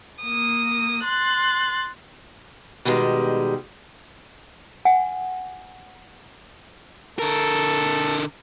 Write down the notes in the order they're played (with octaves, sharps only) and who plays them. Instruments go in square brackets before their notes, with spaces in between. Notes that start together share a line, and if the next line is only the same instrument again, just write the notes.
[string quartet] A#3 D#6
C6 F#6 A6
[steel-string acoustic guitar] B2 D#3 G3 G#3
[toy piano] F#5 G#5
[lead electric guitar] D3 A#4 [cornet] A4